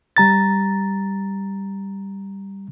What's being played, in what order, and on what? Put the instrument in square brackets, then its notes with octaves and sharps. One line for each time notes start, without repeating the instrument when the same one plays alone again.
[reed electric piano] G3 A#5 A6